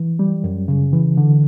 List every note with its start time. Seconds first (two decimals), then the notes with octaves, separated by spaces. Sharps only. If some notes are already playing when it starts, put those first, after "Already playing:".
Already playing: E3
0.19 G3
0.44 F#2
0.68 C#3
0.93 E3
1.17 D3